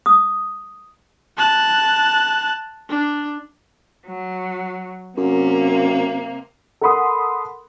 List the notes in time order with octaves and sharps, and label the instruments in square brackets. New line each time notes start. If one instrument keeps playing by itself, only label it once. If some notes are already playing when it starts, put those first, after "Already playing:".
[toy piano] D#6
[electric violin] A5 F#6
D4
[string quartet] F#3
[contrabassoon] F#2 [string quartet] C3 A#3
[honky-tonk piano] A4 A#4 F#5 B5 C6 D#6